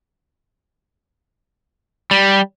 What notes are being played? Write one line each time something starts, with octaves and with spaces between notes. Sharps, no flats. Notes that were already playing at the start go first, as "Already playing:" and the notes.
G3